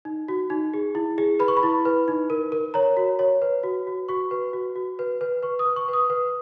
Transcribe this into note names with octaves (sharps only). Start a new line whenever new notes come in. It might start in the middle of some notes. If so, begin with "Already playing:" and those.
D#4
F#4
D#4
G#4
E4
G#4
B4 B5
C#6
B5
E4
B4
D#4
A#4
A#4
C#5 A#5
F#4
C#5
B4
F#4
F#4
F#4 C#6
B4
F#4
F#4
B4
B4
B4 C#6
D#6
B4
C#6
B4
D#6
B4